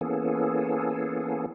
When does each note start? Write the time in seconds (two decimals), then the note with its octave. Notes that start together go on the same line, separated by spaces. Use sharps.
0.01 E3 A#3 B3 C#4 G#4 A4